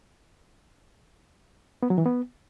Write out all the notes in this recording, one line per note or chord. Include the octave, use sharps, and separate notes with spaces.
B3
F#3
E3
B3